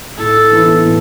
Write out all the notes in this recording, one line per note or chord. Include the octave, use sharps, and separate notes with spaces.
A2 A4
E3 B3 E4
A2